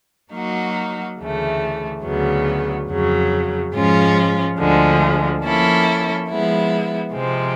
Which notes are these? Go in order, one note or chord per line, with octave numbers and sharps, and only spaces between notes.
F#3 A#3 D#4 F#4
D2 C#3 E3 A3
D2 C#3 F#3 B3
F2 C#3 F#3
G#2 F3 G#3 C#4 F4
D2 D3 F3 G#3
F3 A#3 C#4 E4 A4
F3 G#3 B3 E4
C3 F3 G#3 C4